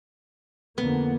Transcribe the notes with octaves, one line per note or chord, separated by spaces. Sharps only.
F2 D3 A#3 B3